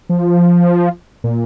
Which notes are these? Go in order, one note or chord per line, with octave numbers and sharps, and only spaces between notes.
F3
A#2